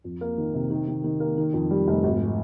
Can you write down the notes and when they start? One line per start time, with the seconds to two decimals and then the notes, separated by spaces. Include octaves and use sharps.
0.04 F2
0.21 A#3
0.38 D#3
0.54 C3
0.70 D#3
0.88 D#3
1.04 D#3
1.20 A#3
1.37 D#3
1.53 F2
1.70 G3
1.87 F1
2.04 G#1